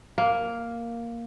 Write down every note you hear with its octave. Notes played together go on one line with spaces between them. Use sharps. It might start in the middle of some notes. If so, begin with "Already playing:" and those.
A#3